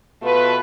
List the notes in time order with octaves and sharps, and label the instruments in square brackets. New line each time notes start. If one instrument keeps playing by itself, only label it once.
[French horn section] B2 A3 F4 B4